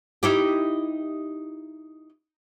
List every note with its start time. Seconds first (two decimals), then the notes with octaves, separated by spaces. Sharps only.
0.23 D#4 E4 G4